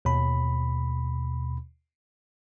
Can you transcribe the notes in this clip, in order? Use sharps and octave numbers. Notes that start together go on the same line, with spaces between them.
D#2 B2 B5